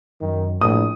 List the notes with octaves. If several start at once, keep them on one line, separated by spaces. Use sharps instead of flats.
F#2 D#3
A#1 A2 D#6